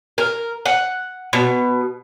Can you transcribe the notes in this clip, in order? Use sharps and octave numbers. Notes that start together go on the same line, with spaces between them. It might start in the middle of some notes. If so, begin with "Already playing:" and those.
A#4
F#5
B2